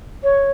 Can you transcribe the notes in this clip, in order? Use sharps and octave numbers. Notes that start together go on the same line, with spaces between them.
C#5